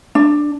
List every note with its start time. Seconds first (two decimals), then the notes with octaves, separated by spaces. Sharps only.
0.15 D4